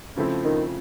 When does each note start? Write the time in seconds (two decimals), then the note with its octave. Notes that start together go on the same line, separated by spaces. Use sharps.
0.16 C#3 F3 A3 C4 E4
0.44 D#3